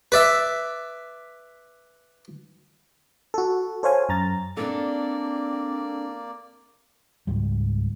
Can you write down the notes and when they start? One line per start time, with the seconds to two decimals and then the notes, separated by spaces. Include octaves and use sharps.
0.12 B4 D5 E5
3.34 F#4 A4
3.83 A4 C5 C#5 F5 G#5
4.09 F#2 A#5 A6
4.57 A#3 C4 D4 A4 D5
7.27 C#2 G#2 G3